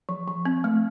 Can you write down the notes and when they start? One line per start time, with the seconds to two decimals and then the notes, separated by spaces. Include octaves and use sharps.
0.09 F3
0.28 F3
0.45 C4
0.64 A3